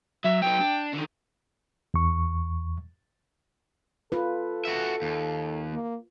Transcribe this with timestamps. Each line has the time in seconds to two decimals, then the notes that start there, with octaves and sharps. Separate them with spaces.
0.24 F#3 E5
0.42 F#3 D#4 G5
0.60 D4
0.93 D3 D#3
1.94 E2 C#6
4.12 F4 A4 B4
4.65 F#4 E5
5.02 D#2
5.73 A#3